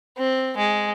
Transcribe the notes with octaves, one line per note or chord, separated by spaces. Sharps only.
C4
G#3